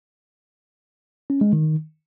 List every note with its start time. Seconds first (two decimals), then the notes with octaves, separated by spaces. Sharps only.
1.30 C#4
1.41 G#3
1.53 D#3